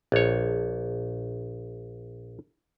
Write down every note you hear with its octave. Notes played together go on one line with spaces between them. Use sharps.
A#1 C#5